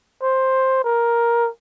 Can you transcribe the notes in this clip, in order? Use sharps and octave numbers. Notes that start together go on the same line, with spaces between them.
C5
A#4